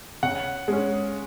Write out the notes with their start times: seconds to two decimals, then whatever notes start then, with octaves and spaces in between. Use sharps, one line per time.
0.23 C#3 F#5
0.68 G#3 C#4